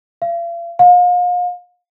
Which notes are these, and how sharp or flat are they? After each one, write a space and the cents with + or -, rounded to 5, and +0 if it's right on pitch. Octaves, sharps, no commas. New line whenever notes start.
F5 -40
F5 +35